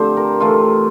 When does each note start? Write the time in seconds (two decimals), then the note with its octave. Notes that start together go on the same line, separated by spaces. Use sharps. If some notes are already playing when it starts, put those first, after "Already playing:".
Already playing: D3 F3 A3 C4 G4 C5
0.17 A#4
0.40 C3 E3 A3 F4